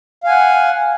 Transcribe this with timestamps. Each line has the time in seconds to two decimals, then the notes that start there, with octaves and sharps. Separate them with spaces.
0.24 F5
0.27 G#5
0.30 F#5